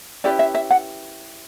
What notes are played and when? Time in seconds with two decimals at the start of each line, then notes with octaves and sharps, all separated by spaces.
0.24 C#4 E4 G4 B4 D5
0.39 E5
0.55 E5
0.71 F#5